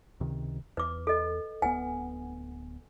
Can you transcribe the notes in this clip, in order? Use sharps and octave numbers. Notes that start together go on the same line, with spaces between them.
C#2 C3 D#3
E2 B4 D6
A4 D#5
D1 B3 B4 F#5 G#5